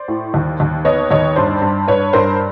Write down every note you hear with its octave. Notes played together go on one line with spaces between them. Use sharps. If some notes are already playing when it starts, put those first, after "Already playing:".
Already playing: C5 D5
A2
D#2
D#2
B3 C#5 D#5
D#2 C#5 D#5
G2 C5 D5
G2
G2 B4 C#5
G2 A#4 C5